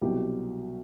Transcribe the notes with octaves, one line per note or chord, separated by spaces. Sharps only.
C2 B2 F#3 G4